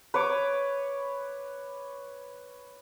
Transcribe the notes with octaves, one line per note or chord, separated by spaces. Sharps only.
B4 C#5 D6